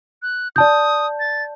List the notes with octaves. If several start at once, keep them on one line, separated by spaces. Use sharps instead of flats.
F#6
D5 A5 D#6 G6
A6